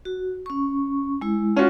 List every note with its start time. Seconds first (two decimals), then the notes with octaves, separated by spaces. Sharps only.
0.05 F#4
0.46 C#4 C#6
1.21 G#3 E4
1.56 C#4 F4 F#4